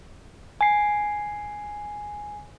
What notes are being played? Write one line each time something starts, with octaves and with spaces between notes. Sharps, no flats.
G#5 C7